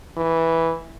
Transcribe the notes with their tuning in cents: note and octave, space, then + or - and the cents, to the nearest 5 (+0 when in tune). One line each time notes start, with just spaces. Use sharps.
E3 -5